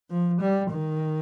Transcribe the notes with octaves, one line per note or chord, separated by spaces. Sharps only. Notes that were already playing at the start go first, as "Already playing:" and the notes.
F3
G3
D#3